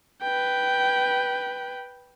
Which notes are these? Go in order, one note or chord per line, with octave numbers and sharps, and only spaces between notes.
B4 G5